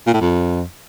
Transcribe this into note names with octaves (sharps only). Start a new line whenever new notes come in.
A#2
A2
F2